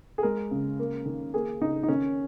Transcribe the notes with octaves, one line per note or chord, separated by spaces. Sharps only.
G#4
G#3 A#4
C#3
A#3
D#3
A#3 G#4
C#3 D#4
D#4
D#3 C#4